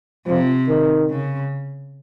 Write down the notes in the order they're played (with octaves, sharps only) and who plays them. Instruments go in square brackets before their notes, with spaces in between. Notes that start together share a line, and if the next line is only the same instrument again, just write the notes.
[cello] C3 [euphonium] F3
[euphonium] D#3
[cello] C#3